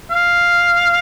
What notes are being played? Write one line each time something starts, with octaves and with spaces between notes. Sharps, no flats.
F5